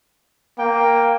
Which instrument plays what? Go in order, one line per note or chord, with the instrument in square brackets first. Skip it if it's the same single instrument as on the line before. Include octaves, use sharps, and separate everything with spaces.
[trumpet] A#3 [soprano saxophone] G5